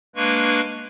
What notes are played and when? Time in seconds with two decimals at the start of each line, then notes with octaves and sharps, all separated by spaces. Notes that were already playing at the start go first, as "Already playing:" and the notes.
0.16 G#3 A#3 D4 B4 C#6